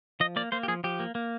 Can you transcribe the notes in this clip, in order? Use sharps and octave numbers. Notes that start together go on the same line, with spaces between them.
F3 D#5
A#3 D5
A#3 C5
G4
F3 G#4
F3 G4
A#3
A#3